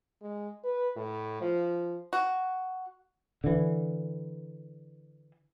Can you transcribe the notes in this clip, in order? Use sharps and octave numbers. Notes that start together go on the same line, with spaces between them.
G#3
B4
A2
F3
F#4
D3 E3